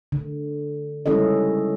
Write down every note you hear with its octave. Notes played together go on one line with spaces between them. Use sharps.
D3
G3 G#3 C#4 E4 A4 D#5